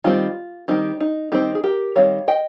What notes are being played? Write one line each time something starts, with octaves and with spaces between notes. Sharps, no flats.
D#3 G3 C4 F4
D#3 G3 C4 D#4 G4
D#4
D#3 G3 C4 D#4 G4
G#4
G4 A#4
D#3 G3 C4 C#5 F5
D#5 G5